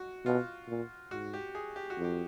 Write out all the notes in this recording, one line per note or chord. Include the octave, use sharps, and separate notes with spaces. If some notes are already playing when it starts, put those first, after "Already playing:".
Already playing: F#4
B2 F4
A#2
G#2 F#4
G4
G#4
G4
F#4
F2
G4